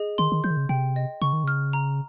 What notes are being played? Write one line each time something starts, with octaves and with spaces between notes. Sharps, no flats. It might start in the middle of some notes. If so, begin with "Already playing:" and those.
Already playing: G#4 D#5
D#3 C6
D#3
F3 G6
D#3
C#3
C3 G5
D#5
C#3 C#6
D#3
C#3 F6
A#5